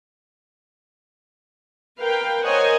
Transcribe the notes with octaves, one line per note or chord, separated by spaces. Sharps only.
A#4 B4 F5 G5
A#4 C5 C#5 D#5 F#5 G#5